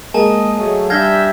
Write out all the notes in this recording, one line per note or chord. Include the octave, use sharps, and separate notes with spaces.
G#3 A#3 D#5 G#5 A5
F#3 A3 G#4
G3 D4 E5 F5 G6 G#6 A#6